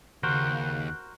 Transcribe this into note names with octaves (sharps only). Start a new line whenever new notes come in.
D#2 C#3 F#4 A#4 C5 F#6